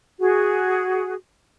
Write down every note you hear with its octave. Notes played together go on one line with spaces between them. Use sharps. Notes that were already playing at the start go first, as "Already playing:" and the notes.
F#4 G#4